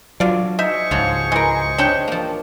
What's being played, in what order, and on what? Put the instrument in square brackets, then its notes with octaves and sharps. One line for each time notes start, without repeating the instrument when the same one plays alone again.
[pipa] D3 F4 D5 [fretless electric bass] F#3
[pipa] D#4 [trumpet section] G#4 C5 C#6 [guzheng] E5
[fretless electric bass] C#2 [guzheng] G#2 F3 F#3
[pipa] E3 A#4 [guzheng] G#3
[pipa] C4 C#5 G5 [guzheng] D4 D#4 G4
[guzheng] F3 A#3